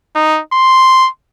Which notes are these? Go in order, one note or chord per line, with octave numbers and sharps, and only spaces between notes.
D#4
C6